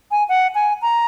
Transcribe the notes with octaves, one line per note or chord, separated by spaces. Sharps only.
G#5
F#5
G#5
A#5